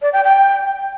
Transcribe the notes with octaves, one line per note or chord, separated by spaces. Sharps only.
D5
G5
G5